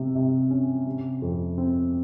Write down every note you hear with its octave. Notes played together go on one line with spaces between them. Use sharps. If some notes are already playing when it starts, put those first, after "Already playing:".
Already playing: C3
C3
C#4
C3
F2
C4